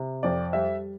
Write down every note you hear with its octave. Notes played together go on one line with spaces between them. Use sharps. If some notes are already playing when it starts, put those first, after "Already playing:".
Already playing: C3
F2 D5
G3 E5